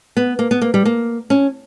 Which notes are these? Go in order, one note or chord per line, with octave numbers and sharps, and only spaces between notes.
B3
A#3
B3
A#3
G3
A#3
C#4